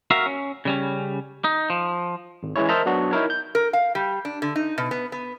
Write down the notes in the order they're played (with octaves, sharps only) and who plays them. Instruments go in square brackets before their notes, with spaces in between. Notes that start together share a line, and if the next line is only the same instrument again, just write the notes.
[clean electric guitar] F#4 A#4 E5 F5
C#4
C#3 G3 C#4
D#4
F3
[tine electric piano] G#1
E3 G#3 C#4 E4 C#5
A#4 C5 D#5 E5 A5 A#5
F#3 B3 D4 F#4
D#4 E4 A#4 C#5
G6
[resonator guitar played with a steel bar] A#4
F5
G3
D4
D3
D#4
B2
B3
B3